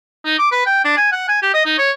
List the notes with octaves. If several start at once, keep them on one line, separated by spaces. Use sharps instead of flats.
D#4
D6
B4
G5
D4
G#5
F#5
G#5
G4
D#5
D#4
C#5